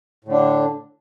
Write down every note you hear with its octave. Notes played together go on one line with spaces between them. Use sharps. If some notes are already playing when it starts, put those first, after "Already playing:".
A2 D3 D4